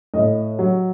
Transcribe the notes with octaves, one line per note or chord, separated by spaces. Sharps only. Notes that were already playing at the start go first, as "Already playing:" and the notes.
A2 D#5
F#3